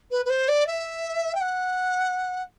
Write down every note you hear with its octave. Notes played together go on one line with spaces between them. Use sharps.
B4
B4
C5
D5
E5
G5
F#5